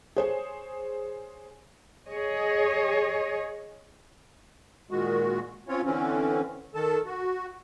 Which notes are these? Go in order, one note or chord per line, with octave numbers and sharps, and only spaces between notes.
G#4 C5 C#5
G#4 C#5 D#5
A#2 D#3 G#3 F#4
C4 C#4 F4 C#5
D3 E3 C4 C#4
D#3 A4 A5
F#4